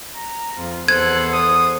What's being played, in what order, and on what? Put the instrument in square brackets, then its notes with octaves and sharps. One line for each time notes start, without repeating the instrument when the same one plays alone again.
[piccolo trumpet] A#5
[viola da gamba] F2 [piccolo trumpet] F4
[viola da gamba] E2 A4 C5 [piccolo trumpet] F#6 [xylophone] G#6
[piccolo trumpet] D#6